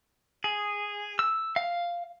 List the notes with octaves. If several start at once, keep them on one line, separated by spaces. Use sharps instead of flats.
G#4
E6
F5